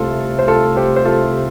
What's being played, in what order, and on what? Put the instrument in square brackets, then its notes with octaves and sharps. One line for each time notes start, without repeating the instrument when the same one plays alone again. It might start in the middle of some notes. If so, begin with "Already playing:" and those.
Already playing: [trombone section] C2 C3 A3 [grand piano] F4 A4
[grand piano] C5
F4 A4
G4 C5
C5
F4 A4